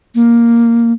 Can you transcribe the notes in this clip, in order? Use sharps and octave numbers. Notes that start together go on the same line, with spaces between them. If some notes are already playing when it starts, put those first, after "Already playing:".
A#3